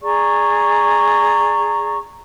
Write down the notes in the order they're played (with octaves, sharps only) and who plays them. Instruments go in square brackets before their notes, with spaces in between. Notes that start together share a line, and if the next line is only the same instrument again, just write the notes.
[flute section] G#4 D5 A#5 C#6